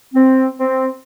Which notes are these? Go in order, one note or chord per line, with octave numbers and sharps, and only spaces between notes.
C4
C4